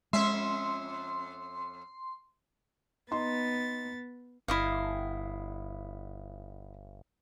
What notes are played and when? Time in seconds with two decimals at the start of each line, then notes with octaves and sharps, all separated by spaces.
0.13 F2 G#3 C#4 E5 C6
3.11 B3 D#4 C6 A6
4.48 G1 E4 D#5 F5